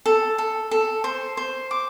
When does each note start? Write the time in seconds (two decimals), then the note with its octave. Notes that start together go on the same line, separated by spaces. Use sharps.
0.06 A4
0.38 A4
0.71 A4
1.04 C5
1.37 C5
1.71 D6